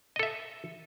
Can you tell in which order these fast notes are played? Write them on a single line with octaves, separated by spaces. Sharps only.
D#5 A4 E5